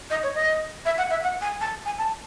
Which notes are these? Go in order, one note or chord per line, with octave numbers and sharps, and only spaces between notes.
D#5
C#5
D#5
E5
F#5
E5
F#5
G#5
A5
G#5
A5